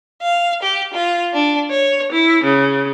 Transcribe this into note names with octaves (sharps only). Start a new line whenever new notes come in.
F5
G4
F4
D4
C#5
E4
C#3